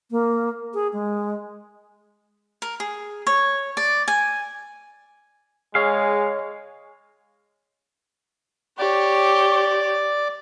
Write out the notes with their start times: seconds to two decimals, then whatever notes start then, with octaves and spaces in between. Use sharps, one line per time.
0.11 A#3
0.74 G#4
0.93 G#3
2.62 A#4
2.80 G#4
3.27 C#5
3.77 D5
4.08 G#5
5.75 G#3 G#4 C#5 F5
8.79 G4 C#5 D5 D6